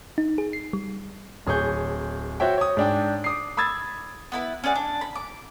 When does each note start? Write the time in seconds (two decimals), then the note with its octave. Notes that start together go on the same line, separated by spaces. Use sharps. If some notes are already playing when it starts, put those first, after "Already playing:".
0.18 D#4
0.38 G#4
0.53 C7
0.73 G3
1.47 D1 G#4 C#5 C#6 G6
2.40 F#4 C5 C#5 E5 G5
2.58 C#5 D#6
2.77 G#2 D4 G5
3.24 D6 D#6 C7
3.57 B5 D#6 E6 G#6 A6
4.32 B3 E4 B4
4.64 C#4 G#4 D5 F#5
4.75 D4
5.01 B5
5.15 D6